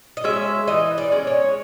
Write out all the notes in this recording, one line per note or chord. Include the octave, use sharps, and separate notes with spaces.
D#5
G#3 C#4 E5
E3 D#5
D5
G#3 C#4
C#5